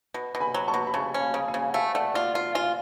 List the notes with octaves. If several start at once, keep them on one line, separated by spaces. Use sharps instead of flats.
B2
B2
G#5 B5
F#3
A5 C#6
B2
B5
C#3 A5 C#6
C#4
F5 G#5
C#3
F5 G#5
C#3
F#5
A3 F5 G#5
A3 D5 F#5
F4 D5
F4 F5
F4 F5 G#5